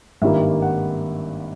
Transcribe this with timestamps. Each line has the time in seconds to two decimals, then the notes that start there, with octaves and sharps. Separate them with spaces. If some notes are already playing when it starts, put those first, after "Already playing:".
0.22 G#1 G2 D#3 G3 A#3 E5
0.62 F#5